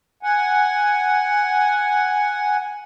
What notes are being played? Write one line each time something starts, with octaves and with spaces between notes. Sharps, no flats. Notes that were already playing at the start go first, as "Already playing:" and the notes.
F#5 G#5